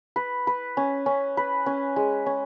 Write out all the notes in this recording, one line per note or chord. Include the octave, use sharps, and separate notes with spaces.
B4
B4
C#4
C#4
B4
C#4
G#3
C#4